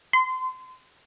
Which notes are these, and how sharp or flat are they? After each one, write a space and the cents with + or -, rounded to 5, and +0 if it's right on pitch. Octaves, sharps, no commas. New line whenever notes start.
C6 -30